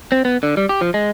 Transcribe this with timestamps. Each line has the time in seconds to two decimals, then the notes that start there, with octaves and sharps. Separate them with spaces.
0.12 C4
0.25 B3
0.43 D3
0.57 G3
0.69 G4
0.81 F3
0.94 G#3